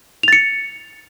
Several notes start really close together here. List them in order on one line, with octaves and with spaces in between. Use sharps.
F7 A6 C#7